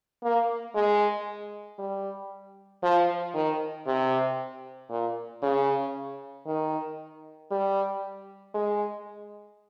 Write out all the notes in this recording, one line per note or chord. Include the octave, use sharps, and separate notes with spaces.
A#3
G#3
G3
F3
D#3
C3
A#2
C#3
D#3
G3
G#3